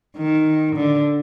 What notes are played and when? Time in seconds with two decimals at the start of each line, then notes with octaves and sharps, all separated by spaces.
0.17 D#3
0.75 D3